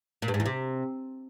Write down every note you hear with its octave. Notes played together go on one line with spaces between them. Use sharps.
A#2
G2
G#2
E2
C3